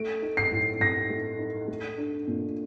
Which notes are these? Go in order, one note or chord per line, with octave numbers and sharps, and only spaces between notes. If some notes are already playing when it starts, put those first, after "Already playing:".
Already playing: A3 D7
D#4
C7
A2
A2 A#6
A3
D#4
A3
D4
A#2